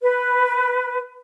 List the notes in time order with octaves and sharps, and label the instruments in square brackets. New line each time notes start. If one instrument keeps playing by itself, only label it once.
[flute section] B4